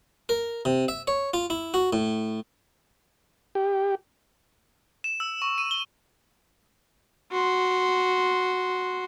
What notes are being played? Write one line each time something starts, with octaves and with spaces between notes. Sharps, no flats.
A#4
C3
E5
C#5
F4
E4
F#4
A2
G4
E7
E6
C#6
D#7
G7
F#4 C6